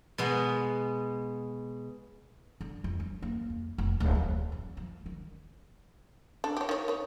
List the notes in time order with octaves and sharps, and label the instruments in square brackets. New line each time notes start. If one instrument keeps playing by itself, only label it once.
[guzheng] B2 G#3 B3
[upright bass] D3
F2
F#3
A#3
F2
F1
D1
E3
F#2
F3
D#3
[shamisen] D4 A4
G4 C#5
D#3 C#5
D#3 C#5